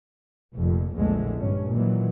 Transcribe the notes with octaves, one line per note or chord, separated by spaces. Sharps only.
F1 F2 A#2
A#1 E2 A#2 D3 G#3 A3
G2 D3 C#4
A#2 D#3 E3 F#3